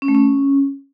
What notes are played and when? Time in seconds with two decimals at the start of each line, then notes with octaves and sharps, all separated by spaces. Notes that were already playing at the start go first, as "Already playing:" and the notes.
0.02 C#4
0.08 A3
0.15 C#4